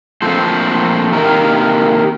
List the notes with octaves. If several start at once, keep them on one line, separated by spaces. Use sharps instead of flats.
A#2 F3 A3 C4 A4 C5
C3 D#3 A#3 G4 A#4